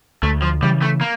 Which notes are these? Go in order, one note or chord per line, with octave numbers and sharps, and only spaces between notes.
D2 A3
F3
C#3 E3 G3
A3
A#3